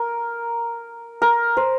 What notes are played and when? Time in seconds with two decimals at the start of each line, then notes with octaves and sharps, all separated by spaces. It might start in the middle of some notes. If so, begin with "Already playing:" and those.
Already playing: A#4
1.22 A#4
1.57 C5